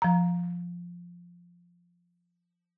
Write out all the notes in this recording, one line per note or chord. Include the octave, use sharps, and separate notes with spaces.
F3 A#5